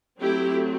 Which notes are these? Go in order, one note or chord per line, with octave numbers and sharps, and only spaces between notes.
F#3 A3 C4 E4 G4